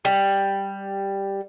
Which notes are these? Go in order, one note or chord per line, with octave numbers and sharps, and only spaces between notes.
G3